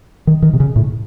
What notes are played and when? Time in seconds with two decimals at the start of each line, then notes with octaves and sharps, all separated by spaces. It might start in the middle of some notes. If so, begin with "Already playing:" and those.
0.27 D#3
0.42 D#3
0.53 C3
0.60 C#3
0.76 A2